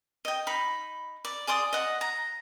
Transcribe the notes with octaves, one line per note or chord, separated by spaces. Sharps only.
D#5 G5
D#4 B5
D5
G#4 D5 C6 D#6
D#5 F#5
A#5